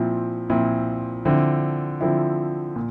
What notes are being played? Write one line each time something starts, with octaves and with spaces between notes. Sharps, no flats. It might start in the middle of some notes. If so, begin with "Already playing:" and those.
Already playing: A#2 F3 C4 E4
A#2 F3 C4 E4
D3 F3 C4 E4
D3 F3 C4 E4
A#2